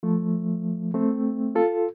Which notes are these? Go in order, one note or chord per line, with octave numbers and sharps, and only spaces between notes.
F3 A3
A3 C4
F4 A4